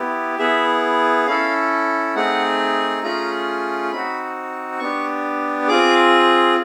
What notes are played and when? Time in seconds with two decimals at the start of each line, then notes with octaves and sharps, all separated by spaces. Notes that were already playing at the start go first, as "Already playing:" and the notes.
Already playing: B3 E4 G4
0.38 B3 E4 G#4 E5
1.26 C#4 E4 A4 F5
2.15 A3 C4 D#4 G#4 F#5
3.03 A3 C#4 F4 G#4 A#5
3.92 C4 D#4 F#4 B5
4.79 B3 D4 G4 C#6
5.68 C4 F4 G#4 D6